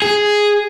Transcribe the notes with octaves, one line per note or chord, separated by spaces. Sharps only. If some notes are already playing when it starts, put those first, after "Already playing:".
G#4